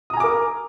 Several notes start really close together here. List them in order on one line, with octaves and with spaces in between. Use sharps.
D#6 A#5 G#5 D6 A#4